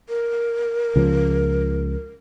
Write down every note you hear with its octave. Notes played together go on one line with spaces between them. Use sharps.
A#4
C#2 C#3 F3